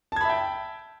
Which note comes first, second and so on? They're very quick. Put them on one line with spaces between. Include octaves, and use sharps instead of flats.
A5 G#6 B5 E5 G5